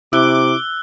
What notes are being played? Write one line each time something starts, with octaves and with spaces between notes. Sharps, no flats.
C3 E4 D6 E6 F#6 G7